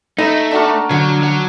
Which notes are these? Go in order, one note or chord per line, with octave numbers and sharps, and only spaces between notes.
A3 D#4 B5
D4 F#4 A#4
D3 F#3
F#3